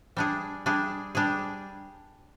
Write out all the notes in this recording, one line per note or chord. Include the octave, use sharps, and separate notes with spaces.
G3 D4 G#4
G3 D4 G#4
G3 D4 G#4